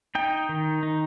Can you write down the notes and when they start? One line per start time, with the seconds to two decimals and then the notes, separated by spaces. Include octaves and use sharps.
0.15 D#4 G5
0.49 D#3
0.83 D#4